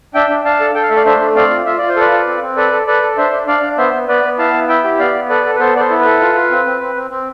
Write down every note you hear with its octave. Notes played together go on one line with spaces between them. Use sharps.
D4 E5 G5
D4
D4 F5 A5
A4
A4 G5
F5
A3 E5
D5 F5
D4 C5 E5
A3
C4 D5 F5
F4
F4 E5
F4 D5
C5
A4 B4 D5
F4
C4
C4
A4 B4 D5
A4
A4 B4 D5
A4
D4 C5 E5
D4
D4 D5 F5
D4
B3 C5 E5
B3
B3 B4 D5
B3
E4 F5 A5
B3
E4 E5 G5
G4
B3 D5 F5
B3
A4 B4 D5
A4
B4
B3 A4 C5
B3 A4 C5 D5
E4
B4
A4
F4
F4
C4
C4
C4
C4
C4